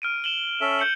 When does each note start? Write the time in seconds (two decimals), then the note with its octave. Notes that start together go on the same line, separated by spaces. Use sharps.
0.02 F6 D7 D#7
0.24 E7 F#7 G7
0.61 C#4 A4 E5
0.79 G6 C#7 F#7